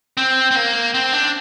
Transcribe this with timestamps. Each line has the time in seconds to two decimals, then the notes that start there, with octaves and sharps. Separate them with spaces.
0.17 C4
0.51 C4
0.56 A#3
0.94 C4
1.13 D4